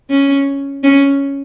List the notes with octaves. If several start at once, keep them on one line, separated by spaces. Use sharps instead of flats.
C#4
C#4